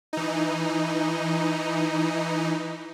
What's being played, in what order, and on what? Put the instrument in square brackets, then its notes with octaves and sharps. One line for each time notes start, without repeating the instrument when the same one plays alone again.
[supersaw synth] E3 D#4